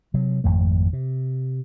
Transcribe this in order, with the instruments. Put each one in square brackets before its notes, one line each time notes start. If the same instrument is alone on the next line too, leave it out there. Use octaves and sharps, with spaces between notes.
[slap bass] C3 F#3
G#1 F2 A3
C3